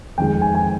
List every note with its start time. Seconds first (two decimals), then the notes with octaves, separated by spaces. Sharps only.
0.18 F2 D#3 G#3 G5
0.41 G#5
0.55 G#5